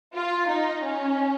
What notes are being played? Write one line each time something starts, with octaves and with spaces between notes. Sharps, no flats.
F4
D#4
C#4